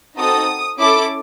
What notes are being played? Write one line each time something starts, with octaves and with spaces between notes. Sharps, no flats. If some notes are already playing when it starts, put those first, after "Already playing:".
C4 D#4 F#4 A4 D#6
C#4 E4 A4 D6